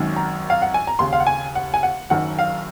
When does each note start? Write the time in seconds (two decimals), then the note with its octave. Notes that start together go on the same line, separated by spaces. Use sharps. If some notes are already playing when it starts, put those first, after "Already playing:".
Already playing: G#1 F#2 D#3
0.16 A#5
0.50 F5
0.62 F#5
0.74 G#5
0.87 A#5
0.99 D#2 C#3 C6
1.13 F5
1.20 F#5
1.27 G#5
1.55 F#5
1.74 G#5
1.83 F#5
2.10 F#1 F#2 D#3 F#5
2.39 F5